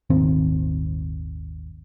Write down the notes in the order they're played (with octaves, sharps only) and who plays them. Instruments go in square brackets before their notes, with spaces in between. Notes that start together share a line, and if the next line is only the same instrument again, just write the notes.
[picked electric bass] D#1 G#1 D#3 C4